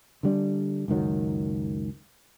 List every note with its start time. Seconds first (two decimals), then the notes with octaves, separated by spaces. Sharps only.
0.23 D3 G3 D4
0.88 C#2 F#2 D#3 F#3